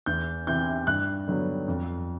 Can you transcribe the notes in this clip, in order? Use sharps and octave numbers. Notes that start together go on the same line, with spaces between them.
E2 G6
C3 E3 G6
G2 F#6
D3 F#3 B3
F2